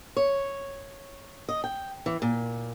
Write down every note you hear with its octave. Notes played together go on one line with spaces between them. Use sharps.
C#5
D#5
G5
E3
A#2